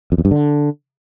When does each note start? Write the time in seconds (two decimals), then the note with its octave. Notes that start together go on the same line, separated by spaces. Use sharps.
0.12 F2
0.18 E2
0.25 G2
0.31 D3